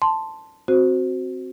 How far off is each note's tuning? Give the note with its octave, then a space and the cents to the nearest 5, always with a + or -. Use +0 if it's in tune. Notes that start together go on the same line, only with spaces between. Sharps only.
A5 +0 C6 +0
C4 +0 F#4 +0 C5 +0